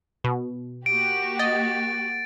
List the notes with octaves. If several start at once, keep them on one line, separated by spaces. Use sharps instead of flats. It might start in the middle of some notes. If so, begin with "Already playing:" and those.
B2
A#3 F#4 G4 D7
D#5 A6